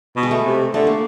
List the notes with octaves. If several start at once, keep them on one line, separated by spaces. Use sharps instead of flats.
B2
G#3
A3
C3
D3 A3
A#3